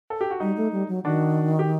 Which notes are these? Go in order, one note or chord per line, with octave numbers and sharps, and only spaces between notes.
A4
G4
F#4
G3 D#4
A3
G3
F#3
D#3 D4 F#4
G4